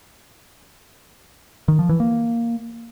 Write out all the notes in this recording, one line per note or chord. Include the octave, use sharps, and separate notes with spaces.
D#3
F3
E3
A#3